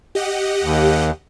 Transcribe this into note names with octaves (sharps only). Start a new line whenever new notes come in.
G4 D#5 F#5
D#2